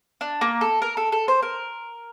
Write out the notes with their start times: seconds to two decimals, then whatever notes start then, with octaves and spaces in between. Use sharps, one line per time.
0.21 D4
0.41 A#3
0.61 A4
0.82 A#4
0.97 A4
1.12 A4
1.28 C5
1.43 A#4